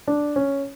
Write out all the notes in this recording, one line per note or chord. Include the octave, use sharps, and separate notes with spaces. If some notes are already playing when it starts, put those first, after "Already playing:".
D4
C#4